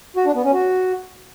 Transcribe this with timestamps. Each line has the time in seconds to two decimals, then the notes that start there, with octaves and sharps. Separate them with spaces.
0.16 F#4
0.26 D4
0.35 B3
0.44 C#4
0.53 F#4